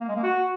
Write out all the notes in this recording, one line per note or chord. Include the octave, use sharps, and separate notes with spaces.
A#3
G#3
A#3
F#4